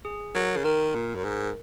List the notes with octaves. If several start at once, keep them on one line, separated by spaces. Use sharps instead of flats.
G#4
F#3 A#4
C#3
D#3 A#4
A#2
F#2
G#2